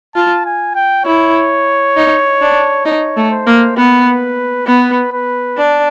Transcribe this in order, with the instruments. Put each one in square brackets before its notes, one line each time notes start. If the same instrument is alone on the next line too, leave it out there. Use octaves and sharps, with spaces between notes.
[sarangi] F4 [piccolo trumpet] A5
[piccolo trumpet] G#5
G5
[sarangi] E4 [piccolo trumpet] C#5
[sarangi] D#4
D4
[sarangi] D#4 [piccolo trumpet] C#5
[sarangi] A3
[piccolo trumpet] C5
[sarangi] A#3
[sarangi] B3 [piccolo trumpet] B4
[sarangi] B3 [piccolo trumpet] B4
[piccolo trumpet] B4
[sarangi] D4